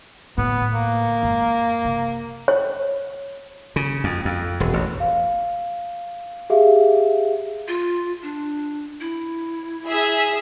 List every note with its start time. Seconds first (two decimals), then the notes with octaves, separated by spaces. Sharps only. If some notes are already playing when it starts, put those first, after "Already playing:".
0.38 A2 D3 B3
0.72 A#3
1.23 F#2 G#3
1.85 C3
2.48 C#5
3.76 C#3
4.04 F2
4.25 F2
4.60 E1
4.73 A1
5.00 F5
6.50 G4 G#4 E5 F5
7.68 F4
8.23 D4
9.01 E4
9.88 G#4 E5